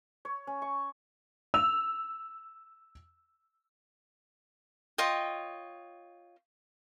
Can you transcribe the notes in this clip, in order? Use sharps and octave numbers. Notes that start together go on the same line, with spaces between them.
C#5
C#4
C#6
E6 F7
F4 C#5 D#5 G5